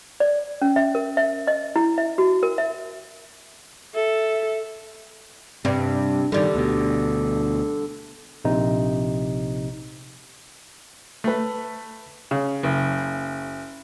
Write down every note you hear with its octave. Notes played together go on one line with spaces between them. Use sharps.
D5
C#4
E5
A#4
E5
D#5
E4
E5
F#4
A#4
E5
A4 E5
G2 C3
G2 D3 D#3 G3
D2 B2
A#1 C3 D#4
A3 B4
C#3
F#1